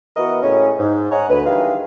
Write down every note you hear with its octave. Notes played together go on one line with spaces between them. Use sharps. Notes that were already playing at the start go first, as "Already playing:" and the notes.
E3 B3 F#4 A#4 D#5
A2 C#3 G#3 C#4
G#2
C#5 D#5 F#5 G#5 A#5
D2 B4
D#3 E3 G3 G#3 D4 F5